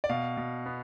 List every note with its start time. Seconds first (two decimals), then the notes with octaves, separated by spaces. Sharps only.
0.04 D5
0.09 B2 F5
0.37 B2
0.66 B3